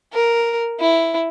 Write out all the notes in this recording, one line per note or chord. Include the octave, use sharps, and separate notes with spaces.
A#4
E4